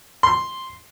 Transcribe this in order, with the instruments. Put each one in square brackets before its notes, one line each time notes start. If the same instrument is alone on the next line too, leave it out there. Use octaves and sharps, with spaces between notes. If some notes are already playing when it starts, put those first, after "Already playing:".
[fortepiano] C6